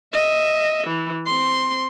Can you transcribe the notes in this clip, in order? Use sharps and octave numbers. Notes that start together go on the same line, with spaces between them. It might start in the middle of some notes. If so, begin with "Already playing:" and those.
D#5 E5
E3
C4 C6